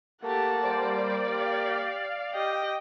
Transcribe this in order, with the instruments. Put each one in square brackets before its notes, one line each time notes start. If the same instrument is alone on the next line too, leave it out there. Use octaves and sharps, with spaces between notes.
[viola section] A3 G4 [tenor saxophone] A#3 [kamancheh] F#5 A5
[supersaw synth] G3 C5 [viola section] D5
[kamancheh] G4 [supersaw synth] F5
[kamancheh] G4 D#5 [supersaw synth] G5